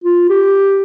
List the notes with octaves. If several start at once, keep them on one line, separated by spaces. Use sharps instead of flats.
F4
G4